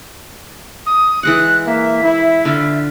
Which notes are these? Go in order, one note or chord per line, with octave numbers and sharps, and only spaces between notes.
D#6
E3 G#3 F#5 F#6
A#3 E5
E4
D3 F4